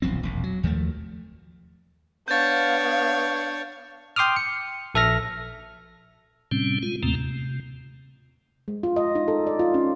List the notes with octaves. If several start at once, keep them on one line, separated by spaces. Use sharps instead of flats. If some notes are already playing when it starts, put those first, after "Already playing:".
D#1 B1 F3 C4
E1 A#1
F#3
D#2 F3 F#3 A3
B3 D4 C#5 F5 G6 A6
G5 C6 D6 D#6 F6
C#7
A#1 A4 E5 F6 A#6
A2 C3 G3 C4 C#4
G#3 F4
D#2 A2 C3 A3 A#3 C4
C3
G#3
F4
D#5
D#4
A4
D5
F4
C#4